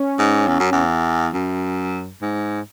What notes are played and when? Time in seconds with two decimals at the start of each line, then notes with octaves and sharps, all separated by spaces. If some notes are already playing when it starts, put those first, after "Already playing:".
Already playing: C#4
0.19 G#2
0.47 E2
0.60 F#2
0.72 E2
1.34 F#2
2.21 G#2